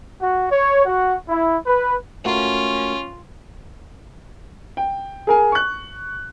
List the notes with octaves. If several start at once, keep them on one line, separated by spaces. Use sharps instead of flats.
F#4
C#5
F#4
E4
B4
A3 C#4 F4 F#4 A#4
G5
G#4 A#4 G#5
C#6 F#6